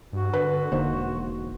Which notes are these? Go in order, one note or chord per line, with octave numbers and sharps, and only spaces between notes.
G2 F#4
D3 B4
E1 D3 A#3 D#4 C5